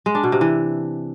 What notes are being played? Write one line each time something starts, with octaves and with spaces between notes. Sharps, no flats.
G#3
D4
B2
C3
E3